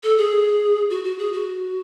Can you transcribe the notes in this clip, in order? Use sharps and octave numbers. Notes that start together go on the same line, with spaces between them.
A4
G#4
F#4
F#4
G#4
F#4